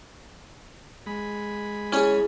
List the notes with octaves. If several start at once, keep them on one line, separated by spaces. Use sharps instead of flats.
G#3 B5
C#4 E4 G#4 C#5